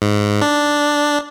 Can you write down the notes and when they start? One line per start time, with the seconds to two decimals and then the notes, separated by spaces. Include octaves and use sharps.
0.02 G#2
0.42 D4